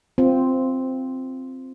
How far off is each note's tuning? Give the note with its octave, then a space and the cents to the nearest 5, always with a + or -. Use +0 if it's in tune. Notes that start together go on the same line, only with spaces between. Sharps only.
C4 +0 F4 +0